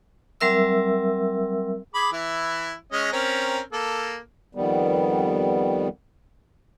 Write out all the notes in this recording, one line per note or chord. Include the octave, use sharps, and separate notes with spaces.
F#3 G3 C4 A#4 E5 E6
G#4 B5 D6
E3 E4
G#3 C#4 D#5
C4 C#4 A#4
A#3 A4
F2 D#3 G3 B3